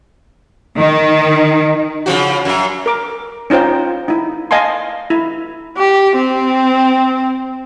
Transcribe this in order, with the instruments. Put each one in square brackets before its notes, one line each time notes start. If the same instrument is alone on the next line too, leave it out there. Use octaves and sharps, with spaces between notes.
[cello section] D#3
[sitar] C#3 F3 F#4
F#2
[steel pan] A#4 D6
C#4 D#4 F4 C5 G5
D#4 E4
D#5 F5 G#5 A5 C6
E4
[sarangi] G4
C4